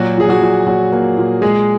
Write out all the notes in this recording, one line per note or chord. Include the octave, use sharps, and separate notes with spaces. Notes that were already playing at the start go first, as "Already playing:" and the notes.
Already playing: A#2 F#3 F#4
F3 G#4
F#3 F#4
A#2
A#2 F#3 F#4
A#3
A#2
G#3 G#4